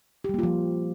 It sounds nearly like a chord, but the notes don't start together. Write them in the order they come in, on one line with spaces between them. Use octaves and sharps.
G4 G3 A#3 F4 F3